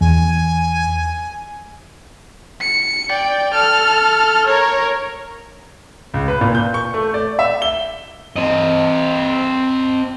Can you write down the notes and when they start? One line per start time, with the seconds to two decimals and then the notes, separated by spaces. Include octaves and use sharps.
0.01 E2 G#5
2.61 C#7
3.10 D5 G5
3.54 A4 F6
4.47 A#4 C#5
6.14 C#2
6.28 B4
6.41 A#2
6.55 G6
6.74 C#6
6.94 A3
7.14 D5
7.39 E5
7.62 G7
8.36 C4 D#5